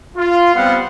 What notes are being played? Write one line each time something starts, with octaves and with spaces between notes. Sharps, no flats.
F4
G3 B3 C4 F5 F#5